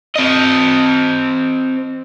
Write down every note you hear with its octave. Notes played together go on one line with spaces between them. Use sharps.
C4 D#5